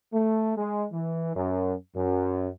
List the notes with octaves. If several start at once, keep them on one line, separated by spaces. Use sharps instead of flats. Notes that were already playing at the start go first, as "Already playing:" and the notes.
A3
G#3
E3
F#2
F#2